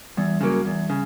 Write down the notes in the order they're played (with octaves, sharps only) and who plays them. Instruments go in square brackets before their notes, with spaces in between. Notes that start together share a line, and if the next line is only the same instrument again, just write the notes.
[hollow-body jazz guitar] E2 [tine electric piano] G3
[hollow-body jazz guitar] C#3 F#3 A#3
E2
C#3